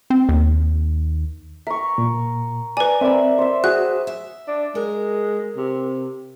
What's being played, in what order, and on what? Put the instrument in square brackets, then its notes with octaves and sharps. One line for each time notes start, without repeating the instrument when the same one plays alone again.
[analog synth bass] C4
D#2
[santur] A#4 C#6 [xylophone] E5
[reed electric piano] A#2
[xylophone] B4 G#5 [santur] D5 A#5
[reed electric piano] C4 A#4 D5 [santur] E5 B5
[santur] C5 E5
[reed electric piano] F#4 [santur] G#4 [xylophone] F#6
[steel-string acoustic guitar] E5
[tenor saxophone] D4
[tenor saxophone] G#3 [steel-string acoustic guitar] A#4
[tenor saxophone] C3